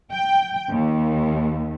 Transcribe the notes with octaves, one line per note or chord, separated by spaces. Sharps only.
G5
D#2